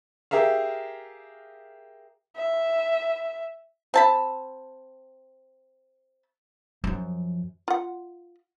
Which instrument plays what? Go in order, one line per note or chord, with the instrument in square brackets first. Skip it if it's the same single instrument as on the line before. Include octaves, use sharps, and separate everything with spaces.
[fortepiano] G4 G#4 A#4 E5 F5
[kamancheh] E5
[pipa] C4 A5 B5
[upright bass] F#2 F3
[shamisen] F4 F#5